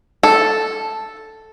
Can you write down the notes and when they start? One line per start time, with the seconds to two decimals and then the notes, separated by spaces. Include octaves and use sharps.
0.23 A4